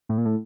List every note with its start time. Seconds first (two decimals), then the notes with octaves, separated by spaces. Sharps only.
0.09 A2
0.18 A#2
0.25 A2